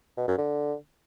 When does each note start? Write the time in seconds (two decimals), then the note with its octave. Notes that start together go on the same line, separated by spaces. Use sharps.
0.17 B2
0.28 F#2
0.38 D3